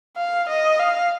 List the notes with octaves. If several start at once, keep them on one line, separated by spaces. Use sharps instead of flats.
F5
D#5
F5